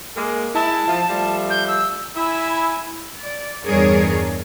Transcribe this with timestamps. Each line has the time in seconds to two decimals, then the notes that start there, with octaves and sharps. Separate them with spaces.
0.16 G#3 A#3 A#4
0.55 G#3 E4 A5
0.88 F3
1.09 F3 G3 A3
1.50 G6
1.68 E6
2.16 E4 E5 G#5 B5 E6
3.19 D5
3.65 E2 G2 D4 G#4 A#4 C#5